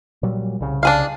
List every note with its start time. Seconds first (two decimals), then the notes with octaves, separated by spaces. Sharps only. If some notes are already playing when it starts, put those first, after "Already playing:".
0.23 A#2 F#3 G3
0.60 C2 C#3
0.83 D4 G#4 F5